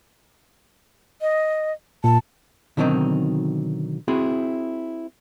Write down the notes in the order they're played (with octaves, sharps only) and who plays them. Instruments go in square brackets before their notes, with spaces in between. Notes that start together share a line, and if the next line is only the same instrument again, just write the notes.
[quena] D#5
[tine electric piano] A#2 [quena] A5
[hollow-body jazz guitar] B2 D3 D#3 F#3 C4 D#4
C4 E4 F#4 G#4